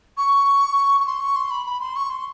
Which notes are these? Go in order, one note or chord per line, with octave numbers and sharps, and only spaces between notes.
C#6
C#6
C6
C#6
C6
B5
B5
C6
C#6
C6